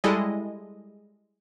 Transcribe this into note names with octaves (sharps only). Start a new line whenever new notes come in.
G3 G#3 E4 A4 D#5